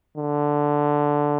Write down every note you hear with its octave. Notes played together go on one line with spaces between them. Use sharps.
D3